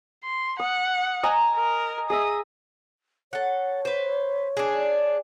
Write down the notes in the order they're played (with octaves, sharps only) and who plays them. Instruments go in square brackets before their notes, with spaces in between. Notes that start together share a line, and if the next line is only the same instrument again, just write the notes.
[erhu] C6
[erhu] F#5 [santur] D#6
[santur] D#5 G#5 A#5
[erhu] A#4
[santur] G#4 D#5 E5 [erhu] D#6
[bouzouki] A4 F#5 [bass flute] C#5
[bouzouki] B4 C5
D4 G#4